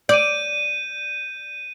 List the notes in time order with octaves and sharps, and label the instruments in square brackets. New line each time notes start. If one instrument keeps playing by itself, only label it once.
[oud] D5 [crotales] G6 D#7